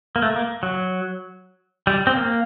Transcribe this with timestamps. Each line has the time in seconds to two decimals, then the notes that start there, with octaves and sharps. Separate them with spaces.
0.16 A#3
0.22 A3
0.36 A#3
0.63 F#3
1.87 G3
2.07 C4
2.15 A#3